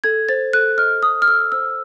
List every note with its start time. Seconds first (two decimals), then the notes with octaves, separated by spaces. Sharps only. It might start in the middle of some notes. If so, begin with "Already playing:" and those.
0.04 A4 G#6
0.29 C5 A6
0.53 A4 F#6
0.78 D#5 F6
1.03 A4 D#6
1.22 F6
1.28 A4 E6
1.52 C5 E6